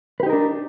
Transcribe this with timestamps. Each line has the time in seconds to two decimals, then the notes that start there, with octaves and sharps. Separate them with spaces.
0.20 B4
0.23 G4
0.26 D#4
0.30 A#4
0.33 D4